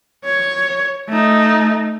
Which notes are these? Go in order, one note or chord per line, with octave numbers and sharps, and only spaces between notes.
C#5
A3 D#4